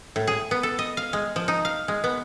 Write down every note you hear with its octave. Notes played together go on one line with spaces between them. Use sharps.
A2
G#4
B3
A4
D#5
F5
G#3
F3
D#4
F5
G#3
B3